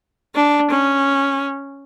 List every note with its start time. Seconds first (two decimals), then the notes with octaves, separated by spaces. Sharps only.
0.35 D4
0.70 C#4